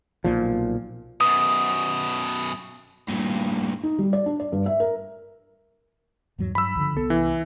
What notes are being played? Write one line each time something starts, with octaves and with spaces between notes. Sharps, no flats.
B1 A#2 F3
F#2 B2 D#6
G2 A#2
D#4
G3
D5
D4
D5
G2
E5
A#4
E2 G#2 F#3
G2 F#3 B5 E6
C#2 D3 F3
C2 B3 A4
E3